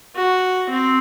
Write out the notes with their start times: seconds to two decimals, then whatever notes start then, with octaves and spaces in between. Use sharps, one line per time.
0.16 F#4
0.69 C4